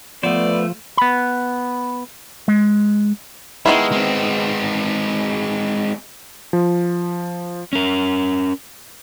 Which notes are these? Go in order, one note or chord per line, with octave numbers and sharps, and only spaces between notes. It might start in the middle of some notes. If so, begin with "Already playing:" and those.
F3 A3 B3 C5 D5
B3 B5
G#3
D#3 G#3 B3 E4
G#3 C4
F3
C#4 A#4